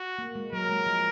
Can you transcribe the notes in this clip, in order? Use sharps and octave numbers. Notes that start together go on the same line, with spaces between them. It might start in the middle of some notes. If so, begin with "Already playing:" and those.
Already playing: F#4
A#3
G#3
F#3 A#4
G#3
F3